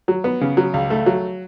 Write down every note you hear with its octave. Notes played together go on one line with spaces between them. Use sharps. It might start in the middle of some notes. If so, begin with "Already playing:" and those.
F#3
B3
C#3
F#3
C#2
A3
F#3